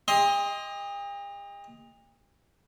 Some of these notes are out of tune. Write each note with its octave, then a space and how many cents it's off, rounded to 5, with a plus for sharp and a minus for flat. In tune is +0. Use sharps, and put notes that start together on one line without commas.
G4 +45 D#5 +15 C6 +0